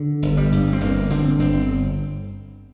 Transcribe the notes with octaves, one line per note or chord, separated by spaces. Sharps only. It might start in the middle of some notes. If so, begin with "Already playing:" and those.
Already playing: D3
G1
G3
G2
C4
G1 A#3
D3 C4
G1 C4